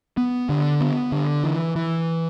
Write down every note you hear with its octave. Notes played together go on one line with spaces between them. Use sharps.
B3
D3
B3
D3
E3
E3